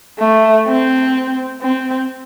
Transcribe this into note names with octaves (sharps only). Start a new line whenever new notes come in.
A3
C4
C4